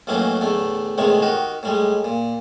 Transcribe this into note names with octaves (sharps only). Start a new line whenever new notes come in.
D#2 A2 E3 F#3 C#4
E2 A2 D3 A3
E2 A2 C3 D#3 G#3 C#5
D#3 F#4 G4
A2 G3 G#3
A#2